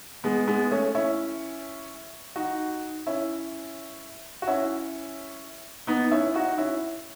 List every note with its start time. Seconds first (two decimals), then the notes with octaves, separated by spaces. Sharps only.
0.24 G#3 B3
0.47 G#3 B3
0.71 A3 C#4
0.95 C#4 E4
2.36 D#4 F#4
3.07 C#4 E4
4.42 F#4
4.47 C#4 E4
5.87 B3 D#4
6.11 C#4 E4
6.35 D#4 F#4
6.58 C#4 E4